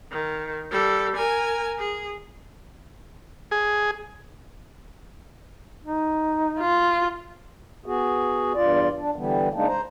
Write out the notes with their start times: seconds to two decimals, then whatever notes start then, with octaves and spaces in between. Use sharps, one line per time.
0.11 D#3
0.71 G3 A4
1.16 A#4 G#5
1.79 G#4
3.51 G#4
5.85 D#4
6.60 F4
7.86 B3 F#4 G#4
8.55 E2 G2 F4 D5
8.99 D4
9.16 D3 E3 G3 B3
9.54 C#3 G#3 A#3 D4 D#4
9.67 C5 A#5